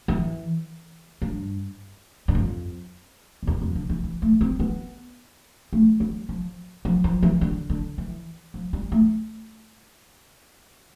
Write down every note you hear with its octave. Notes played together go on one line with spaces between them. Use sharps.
E3
G2
G2
F2
F2
E2
F2
D3
E3
E3
A3
C4
B3
A3
G3
F3
F3
F3
E3
D3
D3
E3
F3
G3
A3